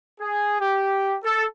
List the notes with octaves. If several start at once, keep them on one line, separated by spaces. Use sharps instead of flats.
G#4
G4
A4